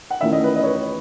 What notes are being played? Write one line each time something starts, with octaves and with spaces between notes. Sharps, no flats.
F#5
E2 D#3 A3 C#4 E4 E5
D#5
B4
D#5
C#5
B4